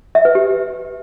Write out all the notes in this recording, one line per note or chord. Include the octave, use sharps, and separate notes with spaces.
E5
B4
G4